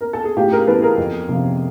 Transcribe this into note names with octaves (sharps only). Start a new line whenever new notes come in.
A#4
A4
G#4
A2 F4 G4
G#4 A#4
E3 A4 B4
G#4 A#4
F2
C3 F3